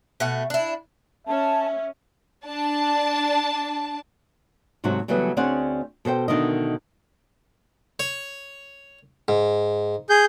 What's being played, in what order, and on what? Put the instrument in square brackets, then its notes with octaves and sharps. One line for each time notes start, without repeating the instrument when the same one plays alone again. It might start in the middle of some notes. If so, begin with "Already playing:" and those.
[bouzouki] B2 A3 F#5
D4 E4
[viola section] C#4 [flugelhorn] E5 [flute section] A5
[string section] D4 A5
[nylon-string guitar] G#2 C3 F#3 A3 F#4
C#3 E3 F#3 G3 A3 B3
D2 C4 C#4 G#4 D5 F#5
B2 A4 C5 G5
B2 D3 D#3 A3 A#4 D#5
[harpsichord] C#5
G#2
[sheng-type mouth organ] G#4 G6